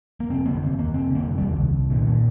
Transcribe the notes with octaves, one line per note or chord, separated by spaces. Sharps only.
A#3
F1 C4
D3 A#3
F1 C4
D#2 A#3
F1 C4
D3 A#3
F1
G3
D#2
C2
C2
A#2 D#3
A#2